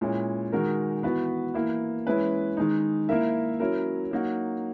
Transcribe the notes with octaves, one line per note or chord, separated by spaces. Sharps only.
A#2 G#3 C#4 E4
D#3 G#3 D#4 F#4 A#4
E3 B3 F#4 B4
E3 A#3 E4
E3 G#3 C#4 E4 B4
D#3 G#3 D#4
A#3 E4 A#4 E5
F#3 C#4 E4 A#4
F#3 A#3 D#4 F#4